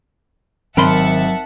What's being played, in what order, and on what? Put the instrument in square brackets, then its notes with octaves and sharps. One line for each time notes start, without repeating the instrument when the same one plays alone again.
[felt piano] G#1 [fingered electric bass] F#3 [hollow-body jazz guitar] A#4 B5 C6 [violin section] E5 F#5 A5